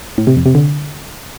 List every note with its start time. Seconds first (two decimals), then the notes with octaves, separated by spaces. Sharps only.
0.18 A2
0.27 C3
0.36 F2
0.46 C3
0.55 D3